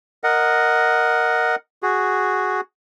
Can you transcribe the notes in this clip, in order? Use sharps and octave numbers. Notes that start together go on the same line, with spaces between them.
A#4 D#5 F#5
F#4 G#4